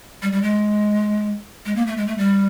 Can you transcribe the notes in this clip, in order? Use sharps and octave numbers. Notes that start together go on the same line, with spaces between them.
G3
G3
G#3
G#3
A#3
A3
G#3
A3
G3